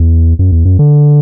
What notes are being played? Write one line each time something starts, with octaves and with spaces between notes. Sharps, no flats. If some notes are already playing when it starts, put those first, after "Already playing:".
Already playing: E2
F#2
E2
F#2
D3